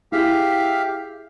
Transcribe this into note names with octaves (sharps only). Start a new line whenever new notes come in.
E4 G4 G#4 E5 F5 B6